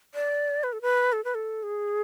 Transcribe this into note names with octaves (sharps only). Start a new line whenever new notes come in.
D5
B4
A4
B4
A4
B4
A4
G#4